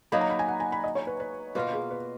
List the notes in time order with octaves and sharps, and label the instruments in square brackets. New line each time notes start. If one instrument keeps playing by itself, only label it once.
[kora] F#3 A#3 D#4 [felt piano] B5
[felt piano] A#5
B5
G#5
F#5
G#5
B5
D#5
C#5
B4
B4
[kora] B2 A#3 F4 A#4 [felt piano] B4
[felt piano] G#4
B4